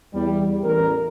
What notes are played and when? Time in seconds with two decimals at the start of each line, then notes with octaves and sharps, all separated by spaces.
0.14 E2 G3
0.64 A1 A#4